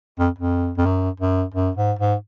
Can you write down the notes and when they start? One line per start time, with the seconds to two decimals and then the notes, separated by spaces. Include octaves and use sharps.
0.19 F2
0.39 F2
0.78 F2
0.86 F#2
1.20 F#2
1.54 F#2
1.77 G#2
1.99 G#2